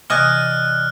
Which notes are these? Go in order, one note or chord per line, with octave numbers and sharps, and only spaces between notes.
C3 E3 D5 D#5 G#5 F6 F#6